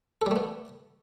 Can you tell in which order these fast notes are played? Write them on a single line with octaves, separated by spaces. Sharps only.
A4 G3 A3 B3